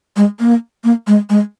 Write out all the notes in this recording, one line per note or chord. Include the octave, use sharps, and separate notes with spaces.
G#3
A#3
A#3
G#3
G#3